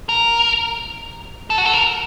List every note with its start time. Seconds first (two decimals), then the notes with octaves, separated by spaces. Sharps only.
0.09 A#4
1.50 A4
1.58 F#4
1.65 A4
1.73 A#4